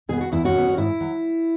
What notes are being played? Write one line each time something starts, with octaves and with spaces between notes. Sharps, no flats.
B2 B3 G#4
F#4
E2 E4
C#4 F#4
B2 B3
C#4
G#2 E4
F#3